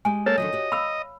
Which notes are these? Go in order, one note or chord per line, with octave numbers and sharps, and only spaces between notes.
G#3 G4 G#5
A#3 A4 C#5 A5
D3 D#3 F#3 D#5
F#4 G4
F5 B5 E6